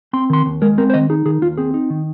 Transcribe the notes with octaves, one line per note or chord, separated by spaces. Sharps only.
C4 C6
D#3 C6
D#2
G#3 A#4
C4 A#4
C5
D#3 D#5
D#4 G#4
D#3 G#4
D#2 F4
C4 G#4
D#4
D#3